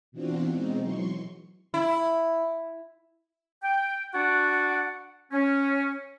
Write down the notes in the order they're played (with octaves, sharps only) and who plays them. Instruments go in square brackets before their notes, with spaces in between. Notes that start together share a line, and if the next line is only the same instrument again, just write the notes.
[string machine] B2 E3 C4 D4 F4 F#4
B2 G#3 C4 D#4
E3 F#3 C6 C#6
[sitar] E4
[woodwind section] G5
D4 F#4 D5 F#5
C#4